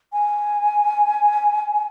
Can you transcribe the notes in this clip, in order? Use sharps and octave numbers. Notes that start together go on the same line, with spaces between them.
G#5